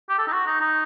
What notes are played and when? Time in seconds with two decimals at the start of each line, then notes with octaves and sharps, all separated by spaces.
0.09 G4
0.19 A4
0.27 D#4
0.33 F#4
0.47 D#4
0.61 D#4